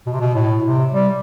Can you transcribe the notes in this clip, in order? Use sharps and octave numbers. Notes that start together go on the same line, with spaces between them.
B2
C3
B2
A2
C3
G3